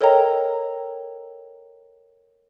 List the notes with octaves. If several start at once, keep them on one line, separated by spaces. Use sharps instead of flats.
A4 A#4 C#5 D#5 G5 A#5